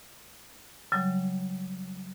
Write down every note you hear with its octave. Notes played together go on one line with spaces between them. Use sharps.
C#3 F#3 G3